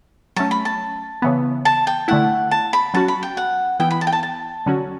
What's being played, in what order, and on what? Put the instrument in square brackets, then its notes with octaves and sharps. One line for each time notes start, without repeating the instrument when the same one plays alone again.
[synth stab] F#3 A3 C#4 [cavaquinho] A5
[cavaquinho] B5
A5
[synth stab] C#3 E3 B3
[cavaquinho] A5
G5
[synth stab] D3 A3 E4 [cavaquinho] F#5
[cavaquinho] A5
B5
[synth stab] F#3 C#4 F#4 [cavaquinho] A5
[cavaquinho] B5
G5
F#5
[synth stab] E3 B3 E4 [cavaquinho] G5
[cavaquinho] B5
A5
G5
A5
A5
[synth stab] D3 F#3 C#4 F#4